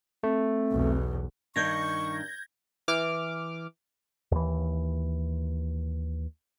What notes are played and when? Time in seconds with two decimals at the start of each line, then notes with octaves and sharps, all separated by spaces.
0.23 A3 C4
0.71 B1 E2
1.56 G2 D#3 C#6 G6 G#6 A#6
2.88 E3 D6 F6
4.32 D#2 E3